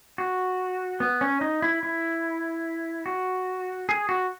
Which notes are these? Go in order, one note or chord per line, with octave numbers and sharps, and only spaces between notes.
F#4
B3
C#4
D#4
E4
E4
F#4
G#4
F#4